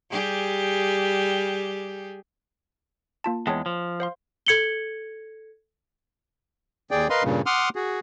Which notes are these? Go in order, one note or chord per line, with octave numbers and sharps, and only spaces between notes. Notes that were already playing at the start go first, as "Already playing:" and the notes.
G3 G4 G#4
A#3 F4 A5
E2 G#3 C#5 G5 A5
F3
C5 F5 C6
A4 G#6 C#7 F#7 G7
D#2 G#4 D5 G5
A#4 B4 D#5 F5 C6
G2 A#2 C#3
F#5 C6 D6 D#6 F6
F#4 G#4